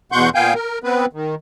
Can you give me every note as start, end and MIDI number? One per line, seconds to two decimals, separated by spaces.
0.12 0.29 40
0.12 0.29 47
0.12 0.29 78
0.12 0.29 84
0.12 0.29 85
0.12 0.29 91
0.35 0.53 46
0.35 0.53 59
0.35 0.53 77
0.35 0.53 79
0.35 0.53 80
0.35 0.53 91
0.54 0.79 70
0.84 1.06 59
0.84 1.06 60
0.84 1.06 71
1.13 1.35 51